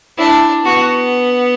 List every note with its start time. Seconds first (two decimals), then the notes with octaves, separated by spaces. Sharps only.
0.18 D4 E4
0.64 B3 F#4